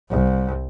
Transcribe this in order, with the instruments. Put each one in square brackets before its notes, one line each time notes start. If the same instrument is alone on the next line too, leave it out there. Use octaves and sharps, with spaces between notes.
[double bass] C2